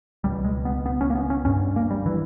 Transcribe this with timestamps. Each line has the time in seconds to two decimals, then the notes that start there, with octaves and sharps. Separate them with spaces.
0.24 C#2 B2 G3
0.44 G#3
0.65 B3
0.86 B3
1.01 C#4
1.10 A#3
1.15 B3
1.30 C#4
1.45 G2 C#4
1.76 A#3
1.90 G3
2.06 E3